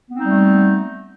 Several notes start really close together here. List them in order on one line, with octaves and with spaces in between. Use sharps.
B3 C4 D#4 G3 A3